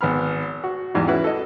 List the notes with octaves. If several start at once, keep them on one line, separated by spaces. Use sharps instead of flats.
G#1 B3 B5 F6
F#4
E2 G#2 G3
C#4 E4 F#4 B4
A4 D#5